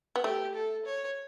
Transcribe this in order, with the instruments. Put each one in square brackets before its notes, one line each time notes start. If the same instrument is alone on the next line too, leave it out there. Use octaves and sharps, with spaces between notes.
[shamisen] B3
[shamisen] A3 [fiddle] G4
[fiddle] A4
C#5